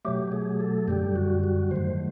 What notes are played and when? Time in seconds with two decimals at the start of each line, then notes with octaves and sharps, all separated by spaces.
0.05 B2 F#3 A3 G4
0.32 G#4
0.60 A4
0.88 F#2 D3 G3 G4
1.16 F#4
1.43 F#4
1.71 G#2 D#3 F#3 A3 C5